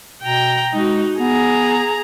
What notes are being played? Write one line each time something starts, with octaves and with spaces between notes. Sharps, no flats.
B2 G5 A#5
G#3 D#4 F#4
B3 G#4 A#5